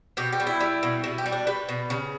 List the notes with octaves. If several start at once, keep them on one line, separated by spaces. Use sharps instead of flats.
B2 G4
G4
G3
E4
G3
B2
B2 E4
G4
G3
D4
G3 B4
B2
C#3